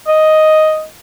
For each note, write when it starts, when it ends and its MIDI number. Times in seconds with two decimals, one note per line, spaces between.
0.07 0.85 75